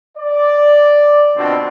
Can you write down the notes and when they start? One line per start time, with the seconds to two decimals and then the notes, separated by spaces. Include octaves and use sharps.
0.18 D5
1.37 B2 D3 F3 C4